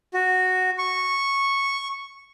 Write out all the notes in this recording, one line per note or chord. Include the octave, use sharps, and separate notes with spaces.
F#4
C#6